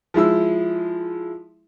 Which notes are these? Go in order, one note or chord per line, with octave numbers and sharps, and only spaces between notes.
F3 G#3 E4 E6